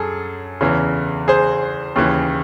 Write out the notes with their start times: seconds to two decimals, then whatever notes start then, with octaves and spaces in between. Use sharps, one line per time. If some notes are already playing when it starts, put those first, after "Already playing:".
Already playing: F#2 G#4 A4
0.61 E2 C#3 E3
1.28 G#4 C5
1.96 D#2 C#3 E3